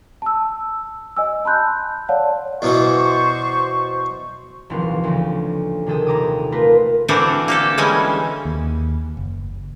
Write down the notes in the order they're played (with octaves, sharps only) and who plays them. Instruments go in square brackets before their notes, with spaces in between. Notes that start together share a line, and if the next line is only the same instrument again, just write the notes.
[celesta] A5 E6
D#5 G#5 E6
A5 B5 C6 F#6 G6
C#5 D5 F5 F#5 A5
[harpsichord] E2 B2 E3 [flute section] C5 C#6
[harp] D#1 C2 E3 F3 C4 F5
D2 C#3
C3 D#3 G#4 A4 G5 D#6
D#1 A#5 D6 D#6
A3 F4 A#4 B4
[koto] D3 E3 C4 D4 F#4 A#4
A#3 G4 A4
D3 E3 G3 G#3 C#4
[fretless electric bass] D#2
F#1